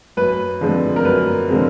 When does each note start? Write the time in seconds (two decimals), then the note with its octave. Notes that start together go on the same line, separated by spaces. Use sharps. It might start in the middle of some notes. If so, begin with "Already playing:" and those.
0.17 F#2 B4
0.61 D3 F3 G#3 C4
0.96 A#4
1.05 F#2 B4
1.48 D3 F3 G#3 C4